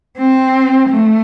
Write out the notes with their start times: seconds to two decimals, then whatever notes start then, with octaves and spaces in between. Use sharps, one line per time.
0.18 C4
0.89 A3